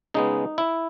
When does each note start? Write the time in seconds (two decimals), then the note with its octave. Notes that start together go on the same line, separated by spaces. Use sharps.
0.14 C#3 G#3 B3 D#4
0.58 E4